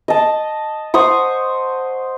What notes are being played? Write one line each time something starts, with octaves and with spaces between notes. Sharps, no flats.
D#5 A5
C5 F#5 C#6 D#6